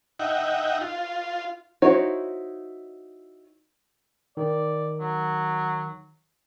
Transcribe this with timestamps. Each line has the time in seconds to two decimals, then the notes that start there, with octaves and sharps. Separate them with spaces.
0.19 D#4 E5 F#5 G5
0.81 F4
1.82 D#4 E4 F#4 C5 C#5
4.37 D#3 D5
5.00 F#3